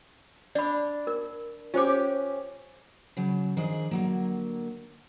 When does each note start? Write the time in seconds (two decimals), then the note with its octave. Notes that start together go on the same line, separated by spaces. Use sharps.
0.55 D4 D5 B5
1.07 A#4
1.74 C#4 F4 G4 C5 D6
3.17 C#3 F#3
3.57 D#3 F3 D4 G#4 D5 D#5
3.91 D3 F#3 A#3